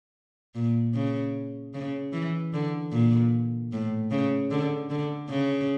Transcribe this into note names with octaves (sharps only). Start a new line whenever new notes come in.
A#2
C#3
C#3
E3
D3
A#2
A2
C#3
D3
D3
C#3